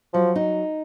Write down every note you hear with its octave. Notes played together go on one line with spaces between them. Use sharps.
F3 F#3
D#4